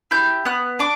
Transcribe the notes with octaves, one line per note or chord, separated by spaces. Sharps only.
E4 G4 G6
B3 F#6
D4 D6